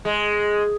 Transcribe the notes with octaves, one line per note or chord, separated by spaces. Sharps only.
G#3